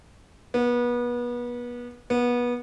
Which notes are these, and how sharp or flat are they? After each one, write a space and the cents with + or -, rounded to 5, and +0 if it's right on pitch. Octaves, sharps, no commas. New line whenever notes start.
B3 -30
B3 -25